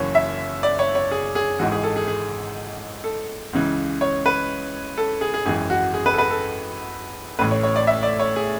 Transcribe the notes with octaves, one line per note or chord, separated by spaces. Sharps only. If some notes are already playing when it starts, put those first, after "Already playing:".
Already playing: F#1 F#2 E3 C#5
E5
D5
C#5
C#5
G#4
G#4
G#1 G#2 E3 F#4
G#4
A4
G#4
G#4
A4
C#2 C#3 E3
C#5
B4
A4
G#4
G#4
G#1 F#2 E3 G#4
F#4
G#4
B4
A4
B4
A4
A1 A2 E3 B4
C#5
C#5
D5
E5
D5
C#5
G#4